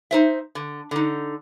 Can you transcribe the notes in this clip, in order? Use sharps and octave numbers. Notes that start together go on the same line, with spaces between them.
D#4 C5 E5
D3
D3 D#4